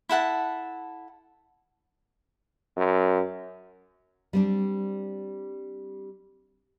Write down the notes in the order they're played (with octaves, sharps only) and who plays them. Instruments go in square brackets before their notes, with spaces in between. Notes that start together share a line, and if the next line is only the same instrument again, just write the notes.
[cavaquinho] E4 A4 F#5 A5
[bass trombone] F#2
[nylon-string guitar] G3 C4 D4